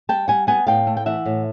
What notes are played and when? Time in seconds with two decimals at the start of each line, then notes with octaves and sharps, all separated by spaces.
0.09 G3 G5 A5
0.28 G3 F#5 G#5
0.47 B3 F#5 G#5
0.67 A2 F5 G5
0.87 A3
0.97 G5
1.06 E3 E5 F#5
1.26 A2